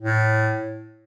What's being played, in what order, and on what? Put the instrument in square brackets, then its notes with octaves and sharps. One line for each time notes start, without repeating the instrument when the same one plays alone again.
[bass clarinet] A2